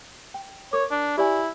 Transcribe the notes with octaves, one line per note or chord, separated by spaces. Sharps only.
G5
A#4 C#5 D6
D4
E4 G4 D5 G#5